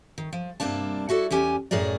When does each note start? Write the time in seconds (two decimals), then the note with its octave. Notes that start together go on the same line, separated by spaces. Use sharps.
0.18 D#3
0.33 F3
0.60 G2 C3 A#3 D4 A5
1.09 E4 F#4 A4 D5
1.31 E2 C#4 G4 G#5
1.71 F#2 A2 G#4 A#4 D5